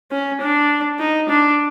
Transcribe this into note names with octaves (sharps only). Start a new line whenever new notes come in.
C#4
D4
D#4
D4